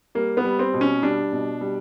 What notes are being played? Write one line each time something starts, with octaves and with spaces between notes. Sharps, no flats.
G3 A#3
B3
G3
C4
B2
C#4
G3 D4
B2
G3